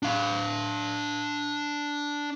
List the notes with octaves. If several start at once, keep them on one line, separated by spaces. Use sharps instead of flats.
D4 F5